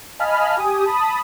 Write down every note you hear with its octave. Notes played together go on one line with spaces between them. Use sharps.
D#5 F5 G#5 A5 B5 F6
G4 G#5 D#6
A5 B5 D#6